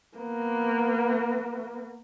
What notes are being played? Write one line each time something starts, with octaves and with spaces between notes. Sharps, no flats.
A#3 B3